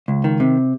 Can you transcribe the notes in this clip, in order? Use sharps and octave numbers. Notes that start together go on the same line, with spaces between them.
C#2
D#3
C3